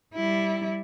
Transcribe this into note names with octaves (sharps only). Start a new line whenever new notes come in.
G3 E4